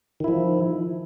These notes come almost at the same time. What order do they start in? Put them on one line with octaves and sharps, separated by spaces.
D#3 E4 F3